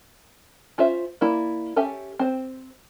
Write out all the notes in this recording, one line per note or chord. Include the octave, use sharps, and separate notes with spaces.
C#4 F4 C5 E5
A#3 E4 D5
C#4 G4 A4 E5 G#5
C4 C5